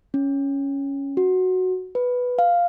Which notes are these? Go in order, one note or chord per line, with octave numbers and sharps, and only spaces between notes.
C#4
F#4
B4
F5